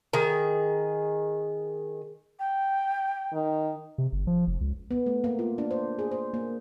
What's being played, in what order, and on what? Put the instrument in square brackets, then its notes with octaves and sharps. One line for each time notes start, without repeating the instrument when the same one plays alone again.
[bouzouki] D#3 G#4
[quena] G5
[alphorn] D#3
[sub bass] C3
G1
F3
F1
C#2
[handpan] B3
A3
A#3
F4
D4
C5
G#4
C5
A#3